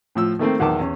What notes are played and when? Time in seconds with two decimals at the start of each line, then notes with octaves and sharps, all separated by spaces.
0.15 A2 F3 E6
0.39 D#3 A3 A#3 C4
0.59 B1 E2 D#3 A5 D6
0.79 E2 C#4